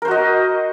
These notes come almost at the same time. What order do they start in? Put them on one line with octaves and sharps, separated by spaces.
A#4 C5 F#4 D#5